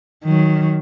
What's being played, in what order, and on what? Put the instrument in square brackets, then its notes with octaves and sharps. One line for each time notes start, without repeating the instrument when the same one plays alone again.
[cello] D#3 F#3